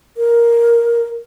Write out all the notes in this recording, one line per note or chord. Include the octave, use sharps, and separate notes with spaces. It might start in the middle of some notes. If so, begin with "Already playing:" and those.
A#4